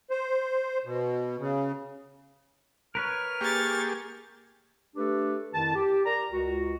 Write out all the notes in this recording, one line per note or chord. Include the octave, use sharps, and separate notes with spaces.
C5
B2
C#3
A#4 B4 C#5 F6
A#3 G4 G#4 C#6 A6
A3 D4 G4 A4 B4
F2 D#3 E4 A5
G4
A#4 D5 A#5
C#2 F#4